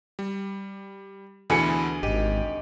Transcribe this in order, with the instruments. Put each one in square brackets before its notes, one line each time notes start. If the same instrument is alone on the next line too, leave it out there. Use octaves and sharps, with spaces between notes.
[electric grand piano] G3
[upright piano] D2 G#4 C#7 [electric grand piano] B2 E3 G#5 [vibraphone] B5
[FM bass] G#1 [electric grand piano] G4 [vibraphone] D#5